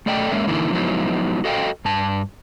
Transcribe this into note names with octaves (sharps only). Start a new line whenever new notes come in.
A3 A4 D5 D#5 G5
G#3 A#3 C#4 E5
D3 E3 A#3 D#4 E4
F3 F#3 G#3 B3 D#4 E4
F#4 A4 D#5 F5 G5
G2 A5